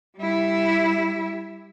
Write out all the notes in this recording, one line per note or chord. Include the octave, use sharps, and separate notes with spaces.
G3 E4